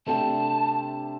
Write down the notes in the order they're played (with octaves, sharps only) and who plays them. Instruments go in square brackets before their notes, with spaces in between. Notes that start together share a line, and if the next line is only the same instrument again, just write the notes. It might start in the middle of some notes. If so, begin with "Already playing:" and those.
[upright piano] C3 A3 D4 G4 [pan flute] A5